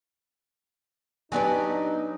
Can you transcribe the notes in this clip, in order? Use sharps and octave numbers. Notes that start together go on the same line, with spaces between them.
F#3 B3 D4 D#4 G4 B4 G#5